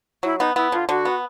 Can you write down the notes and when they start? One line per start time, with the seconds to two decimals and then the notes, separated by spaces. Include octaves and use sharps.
0.23 F#3 E4
0.39 B3 D#4
0.56 B3 E4
0.72 D3 F4
0.89 D3 F#4
1.05 B3